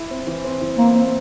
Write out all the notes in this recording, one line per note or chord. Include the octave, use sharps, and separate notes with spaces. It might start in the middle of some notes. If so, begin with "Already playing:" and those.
Already playing: E4
C4
E3
C4
E3
A#3 C4
C4